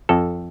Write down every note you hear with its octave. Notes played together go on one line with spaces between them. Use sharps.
F2 A4